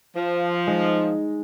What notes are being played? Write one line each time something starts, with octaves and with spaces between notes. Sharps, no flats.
F3
G#3 D#4